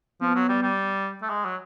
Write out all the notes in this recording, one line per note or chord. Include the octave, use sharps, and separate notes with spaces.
F3 B3
F#3
G3
G3
A3
G#3
F#3